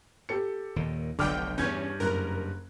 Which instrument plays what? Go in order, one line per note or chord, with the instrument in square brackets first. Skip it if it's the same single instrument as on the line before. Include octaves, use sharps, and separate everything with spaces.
[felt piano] G4 A4 C#7
[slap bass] D#2 A#2 D#3
[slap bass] F1 B1 B2 [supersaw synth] D3 G5 [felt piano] D6 F6
[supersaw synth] E2 C#4 [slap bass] G2 [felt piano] G6 G#6
[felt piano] F#1 F#6 [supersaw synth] A#4